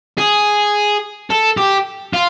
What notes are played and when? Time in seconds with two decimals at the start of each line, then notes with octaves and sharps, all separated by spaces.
0.18 G#4
1.31 A4
1.57 G4
2.13 F4